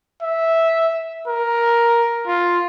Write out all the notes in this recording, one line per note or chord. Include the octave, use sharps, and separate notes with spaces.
E5
A#4
F4